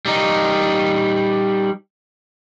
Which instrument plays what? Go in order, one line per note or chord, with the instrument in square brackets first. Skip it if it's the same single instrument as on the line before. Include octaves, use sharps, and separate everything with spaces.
[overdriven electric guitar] G3 D#4